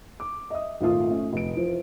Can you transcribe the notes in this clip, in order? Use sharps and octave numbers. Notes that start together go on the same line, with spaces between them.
D6
D#5 E5 D#6
G#1 A#2 A3 F4 F5 D#6
A3 C#4
F1 D7
E3 F3